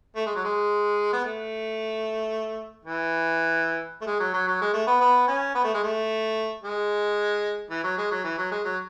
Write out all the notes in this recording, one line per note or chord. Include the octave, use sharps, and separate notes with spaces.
A3
G#3
F#3
G#3
B3
A3
E3
A3
G#3
F#3
F#3
F#3
G#3
A3
B3
B3
C#4
B3
A3
G#3
A3
G#3
E3
F#3
G#3
F#3
E3
F#3
G#3
F#3